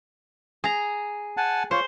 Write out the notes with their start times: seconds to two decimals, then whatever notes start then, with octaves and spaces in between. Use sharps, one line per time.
0.64 G#4 A#5
1.37 F#5 G#5 A5
1.71 F4 C5 C#5